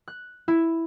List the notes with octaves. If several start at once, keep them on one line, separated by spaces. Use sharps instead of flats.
F#6
E4